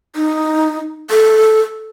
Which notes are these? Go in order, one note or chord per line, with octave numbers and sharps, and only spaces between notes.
D#4
A4